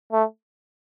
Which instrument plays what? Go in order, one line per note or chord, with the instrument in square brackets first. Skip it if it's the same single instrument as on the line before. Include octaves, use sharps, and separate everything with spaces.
[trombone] A3